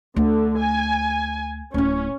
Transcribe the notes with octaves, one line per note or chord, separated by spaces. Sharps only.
D2 D3
G#5
D1 C#4 E4